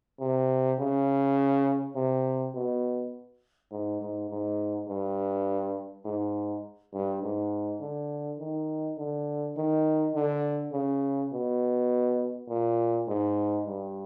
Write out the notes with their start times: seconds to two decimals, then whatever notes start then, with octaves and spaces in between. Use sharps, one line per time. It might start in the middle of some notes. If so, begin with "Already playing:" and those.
0.20 C3
0.79 C#3
1.96 C3
2.55 B2
3.72 G#2
4.01 G#2
4.30 G#2
4.88 G2
6.05 G#2
6.94 G2
7.23 G#2
7.81 D3
8.39 D#3
8.98 D3
9.57 D#3
10.15 D3
10.73 C#3
11.33 B2
12.49 A#2
13.08 G#2
13.67 G2